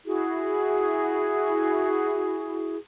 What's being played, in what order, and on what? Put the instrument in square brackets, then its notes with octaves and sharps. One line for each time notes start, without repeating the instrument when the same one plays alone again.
[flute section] E4 F#4 G#4